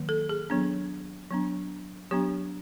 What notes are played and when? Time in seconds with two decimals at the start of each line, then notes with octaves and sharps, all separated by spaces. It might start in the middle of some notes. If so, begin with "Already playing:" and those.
Already playing: D#3 F#3 A#3
0.09 A4
0.29 G#4
0.50 F#3 B3 D4
1.31 F#3 B3 D4
2.11 F#3 B3 D4 G4